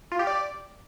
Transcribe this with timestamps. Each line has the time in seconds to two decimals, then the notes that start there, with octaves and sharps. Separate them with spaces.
0.12 F4
0.19 G4
0.27 D5